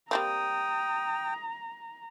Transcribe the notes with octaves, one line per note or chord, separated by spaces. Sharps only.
G3 A#3 C4 G5 A#5 D#6